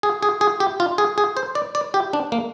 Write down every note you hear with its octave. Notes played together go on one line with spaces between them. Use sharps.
G#4
G#4
G#4
G4
F4
G#4
G#4
C5
D5
D5
G4
D4
A#3